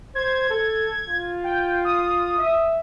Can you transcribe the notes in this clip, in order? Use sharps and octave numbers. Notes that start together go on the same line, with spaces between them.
C5 G#6
A4
F4
G5
D#6
E5